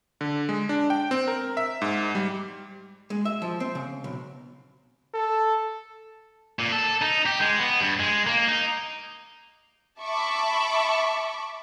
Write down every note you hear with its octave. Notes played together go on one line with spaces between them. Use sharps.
D3
G#3
D4
G5
C4
A#4
E5
G#2
G3
G#3
E5
F3
C4
C#3
B1
A4
A#2
A4
D#4
G4
G#3
B3
G2
G#3
A#3
D#4
E5 A5 B5 C#6 D6